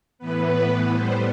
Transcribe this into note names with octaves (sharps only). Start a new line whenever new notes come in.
A2 E3 B3 B4
A2 G3 B3 C5